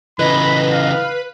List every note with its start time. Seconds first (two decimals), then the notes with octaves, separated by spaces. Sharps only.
0.19 C#3 E3 B4 D#5 B5
0.72 F5